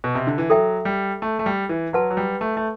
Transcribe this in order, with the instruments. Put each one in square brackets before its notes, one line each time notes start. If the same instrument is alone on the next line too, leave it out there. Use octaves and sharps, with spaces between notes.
[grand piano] B2
C3
D3
E3
[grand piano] F#3 [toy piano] A4 E5 G5
[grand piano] G3
A3
A3
G3
E3
[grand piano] F#3 [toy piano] B4 F#5 A5 C6
[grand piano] F#3
G3
A3
A3